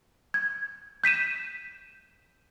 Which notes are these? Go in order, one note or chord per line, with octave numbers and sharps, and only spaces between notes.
G#6
G6 B6 D#7 E7